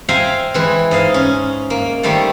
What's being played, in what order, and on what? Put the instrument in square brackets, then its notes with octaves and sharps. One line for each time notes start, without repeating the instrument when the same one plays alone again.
[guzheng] C5 E5 F5 G5 G#5 A#5
E3 G#3
G#2 D#5 F5
C#4
A#3
D#3 G3 A3 C5 A5